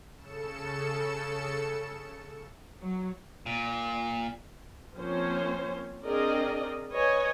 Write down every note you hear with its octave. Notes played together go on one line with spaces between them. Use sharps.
C#3 A4 C#7 E7
F#3
A#2
F3 A#3 C4 C#4 C5 C#5
C4 D4 G#4 A#4 D5 D#5
B4 C#5 D#5 G#5